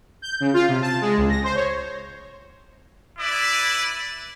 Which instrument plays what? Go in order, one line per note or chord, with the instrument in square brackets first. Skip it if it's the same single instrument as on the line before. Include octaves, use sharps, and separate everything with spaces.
[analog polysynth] G6
C#3
F4
C3
A5
G#3
C#2
A#6
C5
C#5
[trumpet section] E4 B4 D5